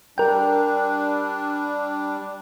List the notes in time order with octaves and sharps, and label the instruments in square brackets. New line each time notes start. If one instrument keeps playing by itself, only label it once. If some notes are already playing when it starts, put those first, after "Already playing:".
[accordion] G3 D4 [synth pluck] A#4 G5